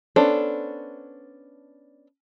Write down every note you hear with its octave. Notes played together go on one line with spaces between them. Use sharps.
B3 C#4 D4 A4 C5